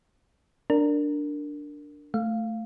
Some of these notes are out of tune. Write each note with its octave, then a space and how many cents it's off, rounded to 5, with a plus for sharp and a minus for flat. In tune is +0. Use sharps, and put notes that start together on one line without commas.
D4 +0 A#4 -10
A3 +0 F5 +0